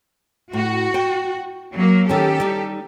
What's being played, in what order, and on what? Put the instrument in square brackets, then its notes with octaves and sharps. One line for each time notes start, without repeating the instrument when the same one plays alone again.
[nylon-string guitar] A2 [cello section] F#4
[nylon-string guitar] G5
[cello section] F#3 A#3
[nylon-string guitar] D#3 C#4 [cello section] G4 A4
[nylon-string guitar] G3 D#4